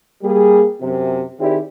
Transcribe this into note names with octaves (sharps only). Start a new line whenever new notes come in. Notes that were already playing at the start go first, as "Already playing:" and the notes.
G3 A#3 G#4
F#2 C3
D#3 C4 E4 G4 G#4 D5